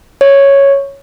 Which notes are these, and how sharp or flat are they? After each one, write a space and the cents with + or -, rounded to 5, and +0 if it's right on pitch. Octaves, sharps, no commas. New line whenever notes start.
C#5 +0